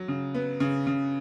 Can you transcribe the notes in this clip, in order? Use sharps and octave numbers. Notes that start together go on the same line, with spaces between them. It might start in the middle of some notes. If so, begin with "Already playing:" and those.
Already playing: F#3
C#3
B3
C#3
C#3